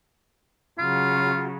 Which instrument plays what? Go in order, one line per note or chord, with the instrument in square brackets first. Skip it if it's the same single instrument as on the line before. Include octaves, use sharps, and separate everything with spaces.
[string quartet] C#3 F#3 [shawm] F4